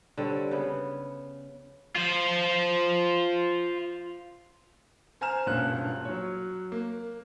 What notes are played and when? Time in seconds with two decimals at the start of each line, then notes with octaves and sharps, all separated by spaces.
0.18 D3 G3 C4 C#5
0.51 C#3 B3
1.95 F4 C5
5.21 C5 G#5 A#5 F6 E7
5.46 E1 G2 A#2 C#4 F#6
6.05 F#3 C#5
6.72 A#3